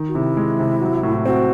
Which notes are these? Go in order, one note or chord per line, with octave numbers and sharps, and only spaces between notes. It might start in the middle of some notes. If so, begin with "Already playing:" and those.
Already playing: D#3
F#4
C3 E4
G#3
C3
F#3
A2
C4 F#4